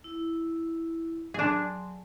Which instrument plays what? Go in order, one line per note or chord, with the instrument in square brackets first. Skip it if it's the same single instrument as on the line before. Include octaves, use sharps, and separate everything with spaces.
[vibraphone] E4
[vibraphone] F#3 C6 [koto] D4 G#4